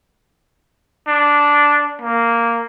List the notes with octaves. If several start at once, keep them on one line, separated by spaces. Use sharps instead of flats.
D4
A#3